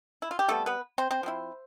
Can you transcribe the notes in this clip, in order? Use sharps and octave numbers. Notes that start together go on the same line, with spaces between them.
E4
F4
G4
C3 G3 A3 B3 A4
B3 B4
C4 C5
C4 C5
F3 C4 E4